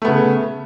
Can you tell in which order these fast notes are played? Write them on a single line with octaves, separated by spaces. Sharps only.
A3 B3 C#3